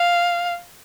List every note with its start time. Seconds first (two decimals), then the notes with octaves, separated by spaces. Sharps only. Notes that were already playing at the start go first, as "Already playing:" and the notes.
Already playing: F5